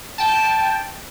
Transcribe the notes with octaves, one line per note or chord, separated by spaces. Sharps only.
G5 A5